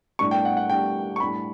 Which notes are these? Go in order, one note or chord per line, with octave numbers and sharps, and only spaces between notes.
A2 G3 D4 G4 C#6
G5
F#5
F#5
A2 G3 D4 G4 G5
C#6
A2 G3 D4 G4 B5